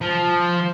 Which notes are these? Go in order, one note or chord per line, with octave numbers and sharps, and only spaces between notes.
F3